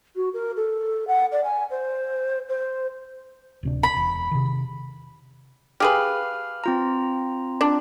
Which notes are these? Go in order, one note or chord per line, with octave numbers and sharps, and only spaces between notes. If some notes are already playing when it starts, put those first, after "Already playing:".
F#4
A#4
A4
F#5
D5
G#5
C5
C5
D1 C3 D4
B5
E1
C3 D#3
G4 G#4 B4 F5 F6
C4 F4 A#5
D4